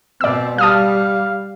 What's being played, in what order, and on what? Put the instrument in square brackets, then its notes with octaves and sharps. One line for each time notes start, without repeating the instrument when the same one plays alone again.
[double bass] B2 C4 [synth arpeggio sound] D5 E6
[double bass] G3 [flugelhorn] F5 [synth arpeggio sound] A5 D#6 F6